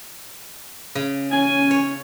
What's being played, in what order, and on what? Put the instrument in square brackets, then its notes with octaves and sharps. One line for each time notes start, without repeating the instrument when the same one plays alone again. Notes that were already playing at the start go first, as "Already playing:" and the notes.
[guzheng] C#3
[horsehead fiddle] C#4 [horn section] G#5
[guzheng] C#5